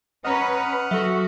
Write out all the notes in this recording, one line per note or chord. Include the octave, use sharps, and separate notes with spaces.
C#4 B4 D#5 F#5 A#5 D#6 F6
F#3 F#4 A4 E5